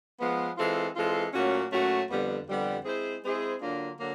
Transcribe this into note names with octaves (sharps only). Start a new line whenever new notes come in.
F3 G#3 B3
E3 G#3 C4 F4 A4
E3 G#3 C4 F4 A4
A#2 F#3 A3 C#4 F#4
A#2 F#3 A3 C#4 F#4
F2 D3 G3 B3
F2 D3 G3 B3
G#3 C4 E4 G#4 C5
G#3 C4 E4 G#4 C5
D3 F#3 A#3 D4 F4
D3 F#3 A#3